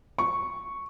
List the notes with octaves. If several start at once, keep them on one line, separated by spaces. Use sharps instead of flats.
C#6